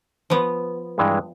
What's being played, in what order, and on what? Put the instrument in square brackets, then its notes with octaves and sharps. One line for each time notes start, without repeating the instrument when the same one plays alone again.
[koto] F3 B3
[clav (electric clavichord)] G2 E3 G#3